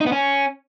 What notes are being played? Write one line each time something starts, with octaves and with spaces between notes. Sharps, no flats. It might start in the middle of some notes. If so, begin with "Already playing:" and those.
D#4
B3
C#4